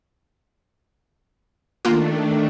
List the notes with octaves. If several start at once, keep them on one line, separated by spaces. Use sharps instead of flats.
D#3 A3 A#3 D4 F4